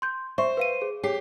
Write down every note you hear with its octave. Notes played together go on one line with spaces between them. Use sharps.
C6 G6
C5 D5 E5 C#6
B4 F5 D#7
G#4
G4 G#4 C#5 C7